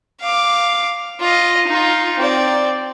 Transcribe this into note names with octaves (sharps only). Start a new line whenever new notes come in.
F5 D6
F4 D#5
D#4 F4
C4 D5